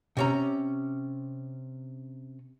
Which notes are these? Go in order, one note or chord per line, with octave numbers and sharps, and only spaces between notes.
C3 C#4 A#5